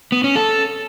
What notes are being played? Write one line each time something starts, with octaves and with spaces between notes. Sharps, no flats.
B3
C#4
A4